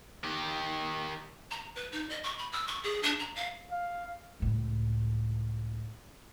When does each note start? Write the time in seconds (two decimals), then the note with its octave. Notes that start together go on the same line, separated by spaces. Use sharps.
0.24 D#3 G4
1.51 A#5
1.76 B4
1.92 D#4
2.10 D#5
2.24 C#6
2.38 B5
2.52 E6
2.68 C#6
2.83 G#4
3.03 D4
3.19 A#5
3.36 F5
3.71 F5
4.40 C#2 A2